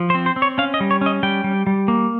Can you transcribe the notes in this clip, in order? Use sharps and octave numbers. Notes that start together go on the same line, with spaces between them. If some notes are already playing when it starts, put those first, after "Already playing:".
Already playing: F3
C5
C4
C5
C4
C#5
C#4 F5
D#5
G3
C#5
C#4 D#5
G3 G5
G3
G3
A#3